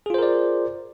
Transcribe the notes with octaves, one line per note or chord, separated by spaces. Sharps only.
F4 G#4 A#4 C5 D5